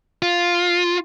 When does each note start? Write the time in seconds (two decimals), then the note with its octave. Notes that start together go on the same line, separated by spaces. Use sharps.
0.22 F4